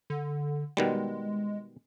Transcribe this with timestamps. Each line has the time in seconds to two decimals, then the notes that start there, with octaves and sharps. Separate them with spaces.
0.10 D3
0.77 B2 D#3 G3 G#3